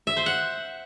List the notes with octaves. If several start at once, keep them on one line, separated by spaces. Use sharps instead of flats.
E5
C5
F#5